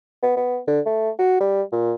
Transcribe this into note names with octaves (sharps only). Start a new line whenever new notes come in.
B3
B3
D3
A3
F#4
G3
A#2